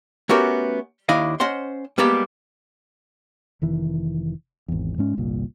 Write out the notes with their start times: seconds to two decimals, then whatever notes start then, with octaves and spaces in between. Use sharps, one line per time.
0.29 A3 B3 C#4 F#4 G4 A#4
1.09 D#2 D#3 D4 E4 D#5 F5
1.40 C#4 C5 D#5 F#5 C6
1.98 G3 G#3 A#3 B3 G4 D5
3.62 F1 D#3 E3
4.68 G#1 E2
4.98 G#2 G#3 C#4
5.17 G1 C2 A#2